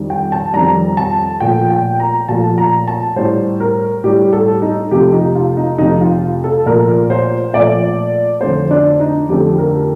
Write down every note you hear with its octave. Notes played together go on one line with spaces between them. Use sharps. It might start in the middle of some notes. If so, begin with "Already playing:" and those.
Already playing: F2 D#3 G3
G5
A5
F2 D#3 G3 A#5
A5
A#2 F3 A3 G5
G5
A#5
A#2 F3 A3 A5
A#5
A5
A2 G3 C5
A#4
A2 G3 G4
A4
D#4
F2 C3 F3 A3 G4
D#4
F4
D#4
F2 C3 F3 A3 D#4
F4
A4
A#2 F3 A3 A#4
C5
A#2 F3 A3 D5
F2 D3 A3 C5
D4
D#4
F2 D3 A3 G4
A#4